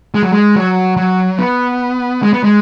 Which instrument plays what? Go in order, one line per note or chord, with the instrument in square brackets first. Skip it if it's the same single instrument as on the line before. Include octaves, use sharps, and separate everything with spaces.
[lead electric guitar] G#3
F#3
G#3
F#3
F#3
B3
G#3
B3
G#3